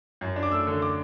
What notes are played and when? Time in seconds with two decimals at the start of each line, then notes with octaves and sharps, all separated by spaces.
0.21 F#2
0.36 D4
0.43 D6
0.52 A3 E6
0.67 D3
0.82 D6